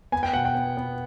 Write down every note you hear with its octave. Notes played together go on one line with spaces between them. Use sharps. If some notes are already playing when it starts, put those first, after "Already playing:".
B3 G#5
G5
B2 F#5
G5
B3
B3